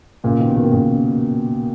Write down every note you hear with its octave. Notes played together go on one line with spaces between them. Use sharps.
A#2 C#3
B2 D#3
B2 D#3
A#2 C#3